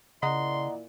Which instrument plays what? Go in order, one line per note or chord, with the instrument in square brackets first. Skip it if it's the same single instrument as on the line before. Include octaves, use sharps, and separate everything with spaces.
[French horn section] A#2 E4 D5 [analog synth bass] C#3 [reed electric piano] D#5 F#5 A#5 [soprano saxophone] C6